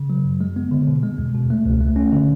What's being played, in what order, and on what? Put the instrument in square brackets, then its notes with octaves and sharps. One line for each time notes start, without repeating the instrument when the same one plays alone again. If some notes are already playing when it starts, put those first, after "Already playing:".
Already playing: [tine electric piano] C#3
F#3
F#2
G#3
B3
D3
B2
G#3
E2
B2
A3
C#2
A3
C#4
D3